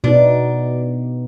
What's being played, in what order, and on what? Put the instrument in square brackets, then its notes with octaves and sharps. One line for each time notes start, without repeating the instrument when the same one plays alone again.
[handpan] B2 B3 D#4 [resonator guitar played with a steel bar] D4